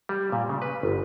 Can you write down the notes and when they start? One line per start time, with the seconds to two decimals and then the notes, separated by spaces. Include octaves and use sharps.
0.09 G3
0.32 A#2
0.49 C#3
0.62 B4
0.83 G1